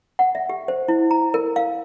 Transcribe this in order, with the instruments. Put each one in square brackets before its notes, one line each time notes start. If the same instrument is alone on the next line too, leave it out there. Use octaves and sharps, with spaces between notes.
[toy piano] F#5
E5
G4
C5
E4
A#5
A#4
F5